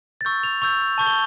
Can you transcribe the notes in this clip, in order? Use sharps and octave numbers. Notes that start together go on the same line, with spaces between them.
A6
C#6 E6 G6
F7
C#6 E6 G6 F7
A5 C#6 G6
G7